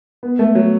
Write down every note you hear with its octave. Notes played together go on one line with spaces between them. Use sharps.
B3
A3
F#3